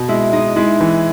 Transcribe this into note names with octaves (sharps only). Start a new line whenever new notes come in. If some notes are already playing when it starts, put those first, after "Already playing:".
Already playing: B2
G#3 E4 E5
G#3 D#4 D#5
G#3 E4 E5
E3